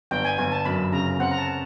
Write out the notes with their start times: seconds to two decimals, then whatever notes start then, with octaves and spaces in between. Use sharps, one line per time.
0.11 G1 G5
0.25 G#5
0.38 G1 G#5
0.52 A5
0.65 F#2 B5
0.93 C#3 A#5
1.20 C4 F#5
1.31 A#5
1.38 A5